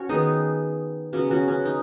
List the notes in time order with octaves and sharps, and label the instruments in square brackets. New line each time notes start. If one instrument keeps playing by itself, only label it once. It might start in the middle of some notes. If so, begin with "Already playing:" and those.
Already playing: [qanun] C#4 F#4 C#5
D#3 B3 D#4 G#4
C#3 F#3 B3 C#4
C#4 F#4
C#4
D#4